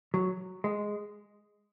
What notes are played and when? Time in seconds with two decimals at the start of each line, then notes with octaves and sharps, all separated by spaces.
0.14 F#3
0.64 G#3